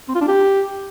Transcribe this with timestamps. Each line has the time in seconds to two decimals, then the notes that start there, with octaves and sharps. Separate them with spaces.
0.08 C4
0.15 F4
0.21 D4
0.28 G4